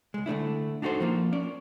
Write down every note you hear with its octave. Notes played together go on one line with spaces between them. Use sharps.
C#2 G#3
D3 A3 D4 E4
D4 D#4 F#4 A4 C5
F3 A#3 F4
C#4 D5